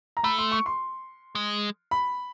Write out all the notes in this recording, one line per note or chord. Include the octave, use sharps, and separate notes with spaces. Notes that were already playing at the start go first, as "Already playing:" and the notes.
A#5
A3 B5
C6
C#6
C6
G#3
B5